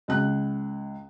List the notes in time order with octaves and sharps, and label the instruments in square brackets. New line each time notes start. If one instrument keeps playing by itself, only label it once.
[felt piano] C#2 F#6